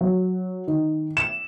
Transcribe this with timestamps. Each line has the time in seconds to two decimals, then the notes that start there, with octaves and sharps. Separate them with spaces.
0.01 F#3
0.68 D#3
1.17 E7